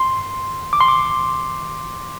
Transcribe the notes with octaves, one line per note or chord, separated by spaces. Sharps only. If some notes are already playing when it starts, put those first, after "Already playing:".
Already playing: C6
D6
C6
D6